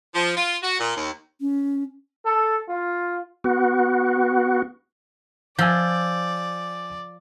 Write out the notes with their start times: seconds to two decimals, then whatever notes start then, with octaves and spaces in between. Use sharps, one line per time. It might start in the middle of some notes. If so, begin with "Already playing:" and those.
0.15 F3
0.36 F4
0.63 F#4
0.79 A#2
0.96 D#2
1.41 C#4
2.26 A4
2.69 F4
3.44 B3 F#4
5.59 F3 D5 G#5 E6 G6